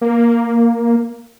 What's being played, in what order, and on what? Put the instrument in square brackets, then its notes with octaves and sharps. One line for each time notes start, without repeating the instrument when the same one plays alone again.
[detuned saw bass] A#3